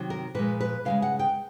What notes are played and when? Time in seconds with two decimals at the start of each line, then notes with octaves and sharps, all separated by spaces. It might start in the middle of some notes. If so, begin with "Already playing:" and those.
Already playing: C3 D#3 F#3
0.10 A#4
0.34 A#2 F3 G#3 B4
0.61 B4
0.85 C#3 F3 G#3 F5
1.02 F#5
1.19 G5